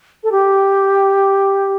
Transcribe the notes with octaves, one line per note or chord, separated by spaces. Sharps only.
A4
G4